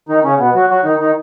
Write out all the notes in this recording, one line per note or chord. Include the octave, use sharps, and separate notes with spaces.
D#3 D#4
C#3 C#4
B2 B3
F#3 F#4
F#3 F#4
D#3 D#4
D#3 D#4